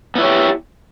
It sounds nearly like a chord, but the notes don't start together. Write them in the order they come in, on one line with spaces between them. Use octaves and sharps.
B3 E4 C#5 G4